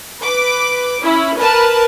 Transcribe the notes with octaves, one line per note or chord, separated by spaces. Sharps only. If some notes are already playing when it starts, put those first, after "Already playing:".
B4 D6
C#4 E4
A#4 B4 A5